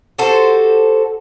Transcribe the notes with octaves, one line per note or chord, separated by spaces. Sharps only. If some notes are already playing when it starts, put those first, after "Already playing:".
F#4 G4 A4 C5